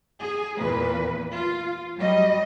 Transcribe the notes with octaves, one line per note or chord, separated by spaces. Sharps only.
G#4
E2 A#2 B4
F4
F#3 G3 D#5